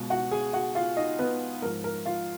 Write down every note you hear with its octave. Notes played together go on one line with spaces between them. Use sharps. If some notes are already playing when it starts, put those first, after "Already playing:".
Already playing: C#2 B2
F#4 F#5
G#4 G#5
F#4 F#5
F4 F5
D#4 D#5
B3 B4
G#2 F3 A#4
A#4
F4 F5